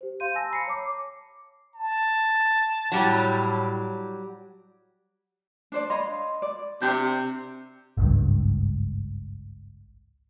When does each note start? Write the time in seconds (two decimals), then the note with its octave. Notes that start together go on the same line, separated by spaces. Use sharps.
0.01 G4 C5
0.20 F5 C6 G6 D#7
0.35 G#5 A5 E6 A#6
0.50 A#5 B5 C7 C#7
0.67 C#5 A5 D6
1.75 A5
2.92 A2 F#3 G3 G4
5.72 D4 C5 D5
5.90 C#5 D#5 F5 B5 C6
6.42 D5
6.82 C3 D4 G4 G6
7.97 G#1 C#2 G2